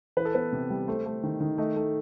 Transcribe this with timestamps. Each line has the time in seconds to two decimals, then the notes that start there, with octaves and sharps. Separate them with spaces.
0.17 E3 B4
0.25 A4
0.34 B3 B4
0.52 C3
0.70 G3
0.88 A3 C5
1.06 A3
1.23 D#3
1.40 D#3
1.58 A3 D#5
1.76 A3